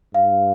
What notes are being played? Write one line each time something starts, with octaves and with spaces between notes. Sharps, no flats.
G2 F5